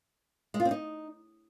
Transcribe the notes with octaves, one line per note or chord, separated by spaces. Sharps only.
G#3
F4
C4
D#4